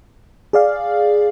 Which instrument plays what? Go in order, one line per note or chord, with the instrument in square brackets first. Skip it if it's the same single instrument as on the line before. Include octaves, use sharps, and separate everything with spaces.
[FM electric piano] G#4 D5 F5